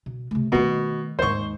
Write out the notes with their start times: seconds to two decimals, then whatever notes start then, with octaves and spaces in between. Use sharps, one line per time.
0.06 B2
0.31 C3 A3
0.52 B2 D#3 A3
1.19 D#2 G#2 C5 C#6